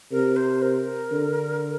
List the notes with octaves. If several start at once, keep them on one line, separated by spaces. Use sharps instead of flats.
C3 A#4
C5
A#4
D3